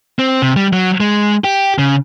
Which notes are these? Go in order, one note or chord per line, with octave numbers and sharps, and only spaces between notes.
C4
C3
G3
F#3
G#3
G4
C#3